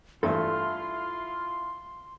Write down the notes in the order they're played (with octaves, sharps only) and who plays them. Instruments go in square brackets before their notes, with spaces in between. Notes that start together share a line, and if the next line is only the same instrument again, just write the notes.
[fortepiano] G2 E3 A3 [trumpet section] E4 F4 [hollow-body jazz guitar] A4 E5 [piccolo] C6